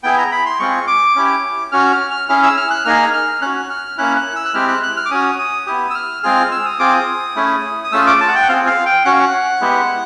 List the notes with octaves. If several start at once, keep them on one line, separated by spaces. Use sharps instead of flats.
B3 E4 G#4 G5
A#5
B5
C6
G#3 C4 F4 G#4 C#6
D6
C#4 E4 G4
C#4 F#4 F6
F6
F6
C#4 E4 G#4 F6
E6
F6
F#6
A#3 D#4 G#4 F6
F6
C#4 F#4 F#6
F6
A#3 C#4 E4 F#6
F#6
E6
F#6
G#3 C4 E4 G4 F6
F#6
F#6
F6
D6
C#4 F#4 D#6
D#6
B3 E4 G4 D#6
E6
F6
G#3 C4 F4 G#4 F6
E6
D#6
C4 F4 G#4 D6
D#6
A3 C#4 E4 G#4
D#6
A3 C#4 F4 G#4 E6
D6
A5
F#5
G5
F#5
C4 F4 G#4 F5
F5
G5
C#4 F#4 F#5
F5
F#5
G#3 B3 E4 G4